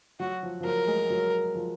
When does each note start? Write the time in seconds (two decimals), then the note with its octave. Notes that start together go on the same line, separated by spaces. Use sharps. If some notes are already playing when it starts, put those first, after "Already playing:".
0.20 F#3 F#4
0.43 F3
0.60 F3
0.64 F#3 A#4
0.87 G#3
1.10 F#3
1.55 F3